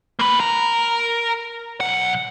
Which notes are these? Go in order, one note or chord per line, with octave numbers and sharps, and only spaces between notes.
A#3 B4
A#4
B1 F#5